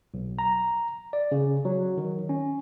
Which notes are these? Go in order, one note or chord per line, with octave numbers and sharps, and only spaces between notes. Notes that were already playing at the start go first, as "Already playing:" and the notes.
B1
A#5
D5
C#3
F#3
D#3
C#4